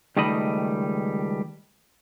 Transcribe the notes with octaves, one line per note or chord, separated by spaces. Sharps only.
C#2 D#3 G3 A3 D#5 B5